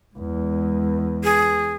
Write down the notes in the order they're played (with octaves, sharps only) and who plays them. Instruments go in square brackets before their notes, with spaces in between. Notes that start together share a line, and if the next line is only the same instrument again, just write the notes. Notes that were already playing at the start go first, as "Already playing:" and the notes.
[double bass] E2 G#3
[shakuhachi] G#4